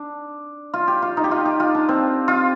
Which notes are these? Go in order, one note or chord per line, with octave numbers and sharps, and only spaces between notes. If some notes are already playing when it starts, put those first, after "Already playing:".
Already playing: D4
F4
G4
F4
D#4
G4
F4
G4
F4
D4
C4
F4